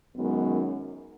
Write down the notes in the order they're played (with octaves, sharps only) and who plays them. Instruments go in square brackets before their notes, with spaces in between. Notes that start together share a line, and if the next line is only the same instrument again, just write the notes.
[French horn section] F#2 D#3 G#3 B3